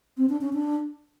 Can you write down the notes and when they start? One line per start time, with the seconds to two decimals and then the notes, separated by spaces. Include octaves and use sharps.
0.17 C4
0.29 D4
0.41 C#4
0.53 D4